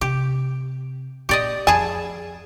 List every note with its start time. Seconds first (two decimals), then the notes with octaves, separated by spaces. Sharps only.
0.01 C3 G4
1.29 A#2 G4 D5 D#5
1.67 F2 G#4 G#5 A5 B5